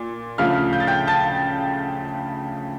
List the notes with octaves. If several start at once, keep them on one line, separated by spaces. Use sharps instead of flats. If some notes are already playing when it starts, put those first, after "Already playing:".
Already playing: A#2
D2 C#3 F3 A3 F5 F6
G6
A6
G5 G6
A5 A6